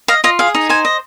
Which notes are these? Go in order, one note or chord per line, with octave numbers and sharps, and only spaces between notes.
D#5 F5
F4 D#5
G#4 F5
D#4
C5 G#5
D#5